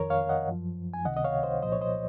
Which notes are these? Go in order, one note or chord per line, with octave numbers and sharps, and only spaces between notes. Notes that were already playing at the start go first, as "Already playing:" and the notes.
Already playing: F2 D#3 A#4 C#5
C#5 F5
D#5 F#5
F#2 F3
G#5
C#2 C3 D#3 D#5 F#5
D#5
C#5 F5
C5 D#5
C2 A#2 F3 C5 D#5
C#5
C5 D#5